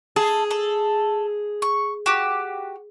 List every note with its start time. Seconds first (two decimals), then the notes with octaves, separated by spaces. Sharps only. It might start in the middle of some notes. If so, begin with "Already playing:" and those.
0.16 G#4 A4
0.51 A4
1.62 C#6
2.06 F#4 G4